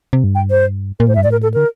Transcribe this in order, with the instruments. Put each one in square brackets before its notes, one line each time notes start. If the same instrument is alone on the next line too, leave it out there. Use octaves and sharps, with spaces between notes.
[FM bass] C3
G2
[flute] G5
C5
[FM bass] A#2 [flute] A#4
[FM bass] A2 [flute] C5
[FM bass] G2 [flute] E5
[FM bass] A2 [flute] D5
[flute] A#4
A4
[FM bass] D3 [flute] A#4